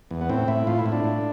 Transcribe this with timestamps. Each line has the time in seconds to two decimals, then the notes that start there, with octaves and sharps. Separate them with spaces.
0.11 E2
0.21 B3
0.29 A2 C4
0.48 A2 E4
0.67 A2 F4
0.79 E4
0.86 A2
0.92 D4
1.04 A2